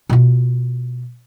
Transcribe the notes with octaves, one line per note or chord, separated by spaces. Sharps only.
B2 F4